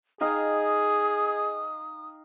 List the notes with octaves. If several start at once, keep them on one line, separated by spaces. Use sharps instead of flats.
D#4 G#4 F5 G5 D#6